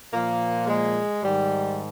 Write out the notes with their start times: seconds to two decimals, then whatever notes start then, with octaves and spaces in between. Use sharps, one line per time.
0.13 A#2 F3 A#3
0.67 G#3
1.22 G#2 D#3 G3